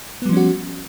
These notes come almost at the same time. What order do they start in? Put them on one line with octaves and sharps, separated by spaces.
B3 G3 F3 C#4 F#4